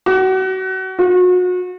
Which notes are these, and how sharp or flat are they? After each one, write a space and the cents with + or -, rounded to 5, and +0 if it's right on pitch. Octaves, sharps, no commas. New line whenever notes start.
F#4 +30
F#4 -35